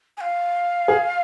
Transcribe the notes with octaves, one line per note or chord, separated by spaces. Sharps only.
G#5
F5
G#4